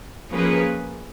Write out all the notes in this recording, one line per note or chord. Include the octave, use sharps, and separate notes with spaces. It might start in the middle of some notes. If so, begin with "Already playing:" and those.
F3 A#3 C#4 G#4 B4